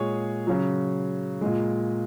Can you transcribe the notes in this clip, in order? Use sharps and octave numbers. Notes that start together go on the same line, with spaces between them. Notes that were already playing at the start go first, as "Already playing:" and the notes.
Already playing: A#2 G#3 G#4 C#5
C#3 F#3
A#2 G#3